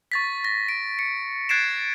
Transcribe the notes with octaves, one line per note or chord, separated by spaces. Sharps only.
C#6 A6 B6
A#6
D7
C#7
F#6 G#6 A6 C7 D7 E7